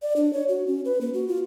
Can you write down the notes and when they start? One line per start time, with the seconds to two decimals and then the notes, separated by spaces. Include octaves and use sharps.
0.02 D5
0.16 D4
0.33 C#5
0.49 F#4
0.67 C#4
0.85 B4
1.01 A#3
1.14 F#4
1.28 F4